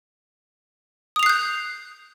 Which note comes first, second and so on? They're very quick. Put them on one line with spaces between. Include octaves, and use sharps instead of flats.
D#6 F7 C7 F#6 G6